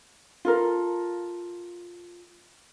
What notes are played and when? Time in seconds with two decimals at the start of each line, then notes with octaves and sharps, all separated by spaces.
0.45 F4 A4 A#4